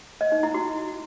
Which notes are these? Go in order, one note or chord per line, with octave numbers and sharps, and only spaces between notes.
D#5
D#4
E4
F#4